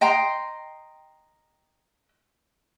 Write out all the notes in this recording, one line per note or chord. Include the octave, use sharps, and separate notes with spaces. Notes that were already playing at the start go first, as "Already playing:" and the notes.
D#5 G5 A#5 C6